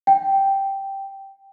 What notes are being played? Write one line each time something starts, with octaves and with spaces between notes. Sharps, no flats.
G5